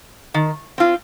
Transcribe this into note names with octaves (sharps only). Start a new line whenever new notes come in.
D#3
C4 F4